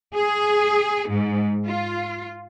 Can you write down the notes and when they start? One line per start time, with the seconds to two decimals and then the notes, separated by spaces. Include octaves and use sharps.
0.14 G#4
1.09 G#2
1.64 F4